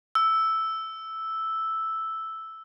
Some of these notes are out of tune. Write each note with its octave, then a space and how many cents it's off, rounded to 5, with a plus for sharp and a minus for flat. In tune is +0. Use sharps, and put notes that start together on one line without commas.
E6 -5